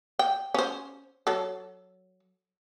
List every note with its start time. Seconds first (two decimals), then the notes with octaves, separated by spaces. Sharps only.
0.19 G5
0.54 C#4 C5
1.27 F#3 A4